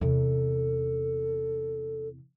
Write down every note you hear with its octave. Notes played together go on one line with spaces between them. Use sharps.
E2 C3 A4